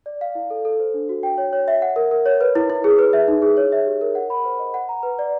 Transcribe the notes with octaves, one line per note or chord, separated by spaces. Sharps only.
D5
F5
E4
A4
A4
C5
D4
F#4
G5
C#5
C#5
E5
F#5
A#4
A#4
C#5
B4
E4
E4
G#4
B4
E5
D#4
G#4
C#5
E5
G4
A#4
F#5
B5
C5
D#5
F#5
A#5
B4
D5